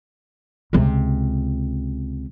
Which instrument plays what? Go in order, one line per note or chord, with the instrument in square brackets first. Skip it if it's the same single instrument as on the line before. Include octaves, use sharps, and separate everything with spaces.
[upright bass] C#2 C3